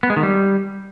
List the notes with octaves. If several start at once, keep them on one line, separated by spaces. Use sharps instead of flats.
B3
G#3
D#3
G3